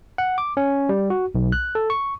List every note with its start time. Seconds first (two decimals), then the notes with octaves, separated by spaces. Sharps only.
0.18 F#5
0.38 D6
0.57 C#4
0.89 G3
1.10 F#4
1.35 B1
1.52 F#6
1.75 A4
1.90 C#6